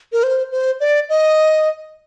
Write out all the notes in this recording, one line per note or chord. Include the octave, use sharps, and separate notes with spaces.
A#4
C5
C5
D5
D#5